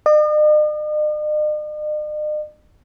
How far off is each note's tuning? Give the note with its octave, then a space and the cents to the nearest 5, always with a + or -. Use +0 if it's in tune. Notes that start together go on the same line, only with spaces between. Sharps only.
D#5 -45